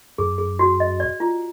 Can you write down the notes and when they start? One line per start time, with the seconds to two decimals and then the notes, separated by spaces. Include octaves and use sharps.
0.18 F#2 G#4
0.38 G#4
0.59 F#4
0.80 D#5
1.00 D5
1.20 F4